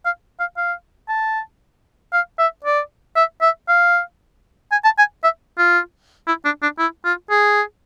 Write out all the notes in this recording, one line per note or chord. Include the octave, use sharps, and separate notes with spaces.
F5
F5
F5
A5
F5
E5
D5
E5
E5
F5
G#5
A5
G#5
E5
F4
E4
D4
D4
E4
F4
G#4